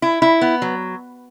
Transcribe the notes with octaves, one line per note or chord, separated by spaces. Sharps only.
E4
E4
B3
F#3